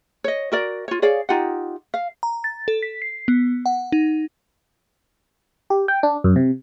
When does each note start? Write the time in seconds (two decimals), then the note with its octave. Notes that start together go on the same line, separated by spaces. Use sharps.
0.24 C#5 D#5
0.52 F#4 A#4 D5
0.88 F4 C#5
1.02 G#4 C#5 D5 F5
1.29 D#4 F4 G4 F#5
1.94 F5
2.23 A#5
2.44 A6
2.68 A4
2.82 B6
3.02 C7
3.28 B3
3.66 F#5
3.92 D#4
5.70 G4
5.88 G5
6.03 D4
6.24 F#2
6.36 C3